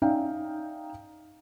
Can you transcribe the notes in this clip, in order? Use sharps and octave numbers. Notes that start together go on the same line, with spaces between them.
C#4 D#4 D5 E5 F5 G5